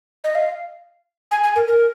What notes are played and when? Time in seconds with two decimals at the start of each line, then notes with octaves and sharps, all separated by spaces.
0.24 D#5
0.35 F5
1.31 G#5
1.44 G#5
1.56 A#4
1.68 A#4